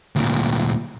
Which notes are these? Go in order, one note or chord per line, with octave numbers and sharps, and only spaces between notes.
D2 A#2